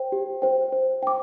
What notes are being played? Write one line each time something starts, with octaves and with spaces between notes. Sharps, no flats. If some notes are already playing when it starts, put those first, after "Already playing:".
Already playing: C5 G5
G4
C5 G5
C5
G5 D6